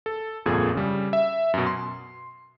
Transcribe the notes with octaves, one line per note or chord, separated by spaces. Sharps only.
A4
G1 F2 A#2 G#4 A4
C#3 G3
E5
F#2 B2
C6